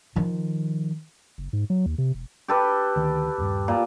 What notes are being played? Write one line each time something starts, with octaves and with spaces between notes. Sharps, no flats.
D#3 F3
F#1
G#2
F#3
D#2
C3
E1
G4 A4 B4
D2 D#3
D#1 G2
A#2